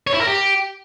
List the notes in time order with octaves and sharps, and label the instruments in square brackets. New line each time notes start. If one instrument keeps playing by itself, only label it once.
[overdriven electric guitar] C#5
E4
A#4
G4